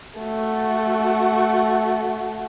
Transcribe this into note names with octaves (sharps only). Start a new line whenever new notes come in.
A3 F#4